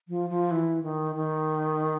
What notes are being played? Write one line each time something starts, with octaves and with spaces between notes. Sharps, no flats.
F3
F3
E3
D#3
D#3